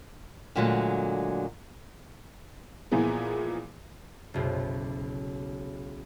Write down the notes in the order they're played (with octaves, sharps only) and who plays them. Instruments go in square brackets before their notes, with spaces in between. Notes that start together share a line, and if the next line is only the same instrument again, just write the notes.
[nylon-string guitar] A#2 D3 F#3 G#3 A3
[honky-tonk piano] A#2 E3 F3 G#3 B3 G#4
[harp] F#1 B1 C5